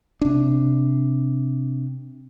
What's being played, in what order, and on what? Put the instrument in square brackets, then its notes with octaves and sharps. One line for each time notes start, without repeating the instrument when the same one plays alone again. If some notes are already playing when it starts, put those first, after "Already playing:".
[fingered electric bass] C3 D4